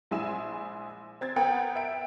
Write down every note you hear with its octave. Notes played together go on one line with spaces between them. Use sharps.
A#1 G#3 E4 G#5 E6 E7
C4 G#6 A6
B3 A#4 F#5 G5
E5 D7